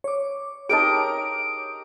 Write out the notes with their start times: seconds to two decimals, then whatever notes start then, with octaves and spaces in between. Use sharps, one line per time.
0.04 C#5 D6
0.69 D#4 G4 G#4 A#4 D#5 D7